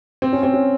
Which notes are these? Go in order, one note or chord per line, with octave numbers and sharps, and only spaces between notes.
C4
C#4
C4
C#4